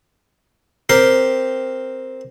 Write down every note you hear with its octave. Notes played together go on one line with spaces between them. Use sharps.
C4 G4 A#4 C6